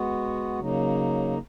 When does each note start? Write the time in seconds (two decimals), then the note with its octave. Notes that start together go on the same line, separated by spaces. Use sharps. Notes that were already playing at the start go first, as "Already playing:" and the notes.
Already playing: G#3 B3 F#4
0.59 C#3 F#3 A#3 D#4